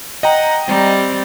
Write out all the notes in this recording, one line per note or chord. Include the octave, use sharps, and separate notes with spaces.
D#5 F#5 G5 A#5
G3 C4